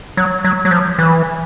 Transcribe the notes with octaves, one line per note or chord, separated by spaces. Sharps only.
F#3
F#3
F#3
F3
E3